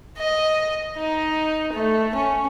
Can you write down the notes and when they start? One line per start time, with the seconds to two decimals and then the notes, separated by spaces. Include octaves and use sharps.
0.18 D#5
0.96 D#4
1.72 A3
2.15 C#4